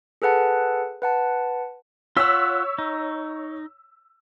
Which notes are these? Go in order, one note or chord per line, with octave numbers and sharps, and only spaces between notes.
G#4 A4 B4 F#5 A5
B4 F#5 A5
F4 C#5 F#5 E6 B6
D#4